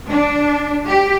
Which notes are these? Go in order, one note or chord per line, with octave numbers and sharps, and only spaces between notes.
D4
G4